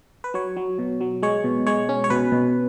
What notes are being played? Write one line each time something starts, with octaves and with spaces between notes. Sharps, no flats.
B4
F#3 C#5
F#3
B2
F#3
G#3 C#5
B2
G#3 C#5
C#4
C#5
B2 B4
B2